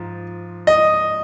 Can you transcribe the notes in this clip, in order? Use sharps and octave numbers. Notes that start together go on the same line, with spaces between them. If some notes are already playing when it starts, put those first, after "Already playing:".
Already playing: G#2 F3
D#5